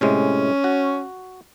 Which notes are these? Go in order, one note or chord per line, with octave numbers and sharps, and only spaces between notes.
A2 C3 G#3 C#4
F#4